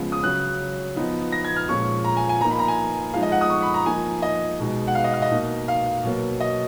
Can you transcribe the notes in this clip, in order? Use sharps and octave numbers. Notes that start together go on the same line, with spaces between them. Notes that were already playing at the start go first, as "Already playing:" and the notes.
Already playing: C#3 F3 G#3 B3
D#6
C#3 F#3 C#4 F#6
F3 B3 D#4
A#6
G#6
F6
A#2 F3 G#3 C#4 C#6
A#5
G#5
G#5
F3 A#3 D#4 A#5
B5
A#5
G#5
F3 G#3 D#4 F5
D#5
F#5
D#6
C#6
B5
A#5
F3 A#3 D#4 G#5
D#5
B2 G#3 D#4
F#5
F5
D#5
F5
D#5
B2 A#3 D#4
F5
B2 F#3 A#3
D#5